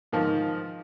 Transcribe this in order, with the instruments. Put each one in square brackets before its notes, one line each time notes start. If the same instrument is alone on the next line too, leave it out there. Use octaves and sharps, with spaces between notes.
[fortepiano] G#2 D#3 F3